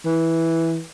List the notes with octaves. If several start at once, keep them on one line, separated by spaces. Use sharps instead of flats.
E3